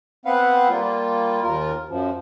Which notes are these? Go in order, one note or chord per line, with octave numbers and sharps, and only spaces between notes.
B3 C4 B4 F5 F#5
G3 A#3 F4
D#2 F4 A#4
F#2 F3